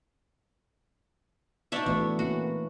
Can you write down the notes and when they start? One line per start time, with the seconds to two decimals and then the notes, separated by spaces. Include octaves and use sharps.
1.72 D4 D#4 F#4 C#5 D5 E5
1.86 E3 A3 B3 F#4
2.19 A#3 C#4 F#4